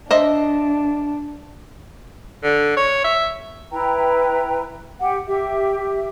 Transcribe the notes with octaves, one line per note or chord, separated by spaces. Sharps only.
D4 C5 D#5 E5
D3
C#5
E5
E4 B4 G5 A#5
G4 F#5
G4 E5